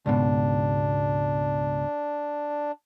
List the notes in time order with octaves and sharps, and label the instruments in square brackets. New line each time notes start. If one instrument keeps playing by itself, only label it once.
[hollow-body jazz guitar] C#2 G#2 B2 [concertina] D4